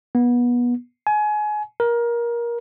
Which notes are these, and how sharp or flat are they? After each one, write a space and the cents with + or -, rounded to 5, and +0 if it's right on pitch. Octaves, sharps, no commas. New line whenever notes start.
B3 -25
G#5 +25
A#4 +20